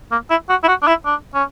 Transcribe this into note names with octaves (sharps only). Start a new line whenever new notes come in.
A#3
E4
F#4
E4
F#4
D4
E4
D4
C#4